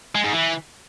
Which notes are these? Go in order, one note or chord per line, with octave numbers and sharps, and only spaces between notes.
G#3
G#2
E3